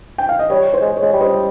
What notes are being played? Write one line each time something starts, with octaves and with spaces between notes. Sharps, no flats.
G5
F5
D#5
G3 C#5
C5
G#3
C#5
G#3
G3
C5 D#5